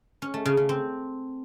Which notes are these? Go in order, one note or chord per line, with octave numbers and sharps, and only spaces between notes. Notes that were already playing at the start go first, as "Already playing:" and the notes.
C#4
A3
C#3
C#3
C4